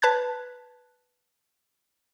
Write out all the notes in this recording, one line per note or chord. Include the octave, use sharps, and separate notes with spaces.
B4 A5 F#6 G#6